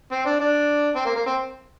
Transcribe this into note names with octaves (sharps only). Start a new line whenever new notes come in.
C4
D4
D4
C4
A#3
A#3
C4